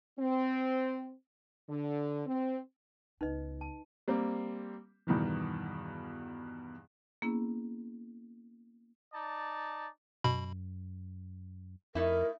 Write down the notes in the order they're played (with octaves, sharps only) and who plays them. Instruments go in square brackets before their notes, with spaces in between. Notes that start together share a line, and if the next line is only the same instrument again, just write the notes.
[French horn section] C4
D3
C4
[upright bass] C#2 B3 [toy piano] D#4 B4 D#5
[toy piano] A5
[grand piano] G3 A#3 C4
E2 G2 B2 D#3 E3
[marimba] A#3 B3 C#4 E4 G#4
[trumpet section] D#4 D5 A5
[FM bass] F#2 [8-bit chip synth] B2 B5
[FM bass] F2 [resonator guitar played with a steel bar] A3 D#4 E4 [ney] A#4